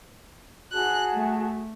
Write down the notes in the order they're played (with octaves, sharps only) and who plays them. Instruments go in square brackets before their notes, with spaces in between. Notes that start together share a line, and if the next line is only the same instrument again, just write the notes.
[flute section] F#4 G#4 A5 [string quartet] F#6
[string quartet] A3